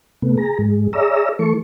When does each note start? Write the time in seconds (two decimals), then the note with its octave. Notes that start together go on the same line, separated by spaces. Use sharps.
0.22 C3 A3 B3
0.37 G#4 A#5
0.59 G#2 G#3
0.93 G#4 C#5 D5 E5 A#5 E6
1.39 E3 A3 A4 C#6